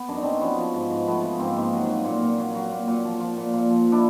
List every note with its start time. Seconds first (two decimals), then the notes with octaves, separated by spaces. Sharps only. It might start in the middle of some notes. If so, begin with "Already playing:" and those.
Already playing: B3
0.08 F#2 D4
0.16 D#4
0.23 F#3 C4 D4
0.41 F3 B3 C#4
0.58 F3
0.74 G#2
0.91 G#2
1.07 F3 A3 B3
1.23 F3
1.39 G#2 A#3 C4
1.57 G#2
1.73 F#3
1.89 F#3
2.05 A#2
2.22 A#2
2.39 F#3
2.55 F#3
2.72 A#2
2.88 A#2
3.05 F3
3.21 F3
3.37 A#2
3.54 A#2
3.69 F3
3.86 F3
3.92 D4 E4